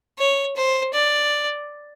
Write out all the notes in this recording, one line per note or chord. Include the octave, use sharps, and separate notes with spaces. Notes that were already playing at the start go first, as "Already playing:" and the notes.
C#5
C5
D5